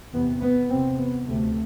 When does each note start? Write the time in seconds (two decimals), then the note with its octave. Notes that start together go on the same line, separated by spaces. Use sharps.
0.13 E2 C3 B3
0.41 B3
0.69 E2 C3 C4
0.98 B3
1.26 D2 C3 A3